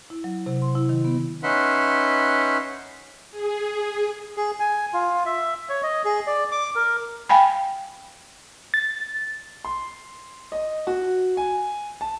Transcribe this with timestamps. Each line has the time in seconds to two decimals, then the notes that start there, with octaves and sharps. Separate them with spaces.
0.10 E4
0.24 F#3
0.46 C3
0.62 C6
0.75 E4
0.89 D#3
1.05 B3
1.43 C#4 D#4 B4 E5 F#5 C6
3.31 G#4
4.37 G#4
4.60 G#5
4.93 F4
5.26 E5
5.69 C#5
5.83 D#5
6.05 G#4
6.27 D5
6.52 D6
6.76 A#4
7.29 F5 G5 G#5 B5
8.74 A6
9.65 C6
10.52 D#5
10.87 F#4
11.37 G#5
12.01 A5